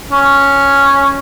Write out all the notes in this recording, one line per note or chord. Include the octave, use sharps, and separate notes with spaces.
C#4